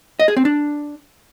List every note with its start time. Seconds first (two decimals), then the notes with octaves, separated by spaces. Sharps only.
0.20 D#5
0.28 G#4
0.37 C4
0.45 D4